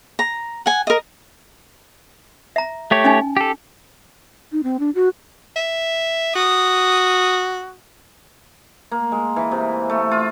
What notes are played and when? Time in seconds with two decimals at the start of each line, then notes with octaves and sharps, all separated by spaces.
0.19 A#5
0.66 F#5 G#5
0.87 A#4 D#5
2.56 E5 A#5
2.91 A3 G4 C#5
3.04 C#4 D#4 G#5
3.37 G4 A4
4.52 D#4
4.63 C4
4.79 D4
4.95 F#4
5.56 E5
6.35 F#4 D#6
8.91 A#3
9.12 G#3
9.36 E3
9.51 C3
9.90 A3
10.11 F4